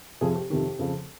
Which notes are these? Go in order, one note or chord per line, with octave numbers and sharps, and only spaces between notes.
F2 C3 F3 G#4
G4
F2 C3 D#3 G4
F2 C#3 F3